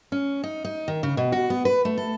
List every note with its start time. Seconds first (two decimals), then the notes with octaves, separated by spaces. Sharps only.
0.12 C#4
0.44 D#4
0.65 D#4
0.88 D#3
1.03 C#3
1.17 B2
1.32 F#4
1.50 B3
1.65 B4
1.85 A3
1.97 A4